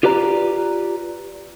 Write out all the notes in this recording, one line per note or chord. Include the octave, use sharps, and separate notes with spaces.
F4 G4 B4 D5 A#5